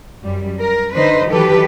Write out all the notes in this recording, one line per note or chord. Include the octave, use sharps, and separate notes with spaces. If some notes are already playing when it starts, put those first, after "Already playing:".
F#2 G3
A#4
D3 D#4 B4 C5
D#3 E3 F#3 G4 A4 B4